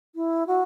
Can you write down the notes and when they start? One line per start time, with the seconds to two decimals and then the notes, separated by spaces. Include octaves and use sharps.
0.15 E4
0.47 F#4